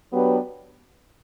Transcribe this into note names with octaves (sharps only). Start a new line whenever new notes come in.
F#3 B3 D4 G4 B4